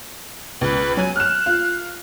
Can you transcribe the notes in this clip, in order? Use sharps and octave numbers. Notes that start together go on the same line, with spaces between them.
C#2 B4
F#3 G#5
F6 F#6 E7
F4